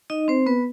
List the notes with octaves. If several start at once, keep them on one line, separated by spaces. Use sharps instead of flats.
D#4 D#5
C4 C5
B3 B4